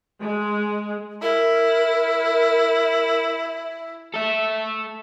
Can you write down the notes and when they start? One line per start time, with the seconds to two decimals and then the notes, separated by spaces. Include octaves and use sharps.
0.22 G#3
1.22 E4 A#4
4.14 A4 E5